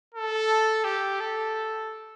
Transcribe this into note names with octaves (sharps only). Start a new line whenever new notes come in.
A4
G4
A4